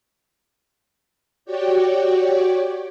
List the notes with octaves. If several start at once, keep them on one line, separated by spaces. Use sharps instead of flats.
F#4 G4 C#5 D5 G5